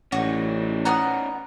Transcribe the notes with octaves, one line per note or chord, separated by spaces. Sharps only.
A1 C#4 D#4 F#4
B3 F#5 A#5 F6